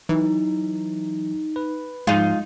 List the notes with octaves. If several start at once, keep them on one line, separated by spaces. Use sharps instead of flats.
E3 F#3 D#4
B4
G#2 F3 G#3 D#4 F4